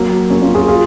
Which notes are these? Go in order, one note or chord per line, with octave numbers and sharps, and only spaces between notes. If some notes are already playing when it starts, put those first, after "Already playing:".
Already playing: F#3 A#3
A#3 C#4
C#4 F4
F4 G#4
F4 G#4